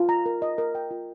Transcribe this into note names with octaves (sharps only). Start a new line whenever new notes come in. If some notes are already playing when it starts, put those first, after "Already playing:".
Already playing: F4
A#5
A#4
D#5
A#4
G5
F4